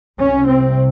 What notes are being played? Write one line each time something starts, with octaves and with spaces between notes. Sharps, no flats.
C2 C3 C#4
C4